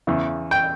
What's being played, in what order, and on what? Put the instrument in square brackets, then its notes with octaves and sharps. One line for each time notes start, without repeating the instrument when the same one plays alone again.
[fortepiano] E2 C#3 E3
G5